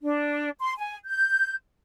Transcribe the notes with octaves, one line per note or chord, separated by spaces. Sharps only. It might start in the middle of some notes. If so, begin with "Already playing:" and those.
D4
C6
G#5
G6